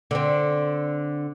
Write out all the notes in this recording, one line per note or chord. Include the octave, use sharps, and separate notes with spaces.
D3 C4